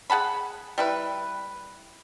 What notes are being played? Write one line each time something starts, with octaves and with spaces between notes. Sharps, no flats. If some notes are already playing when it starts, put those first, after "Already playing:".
G#4 F#5 A5 B5
G3 E4 B4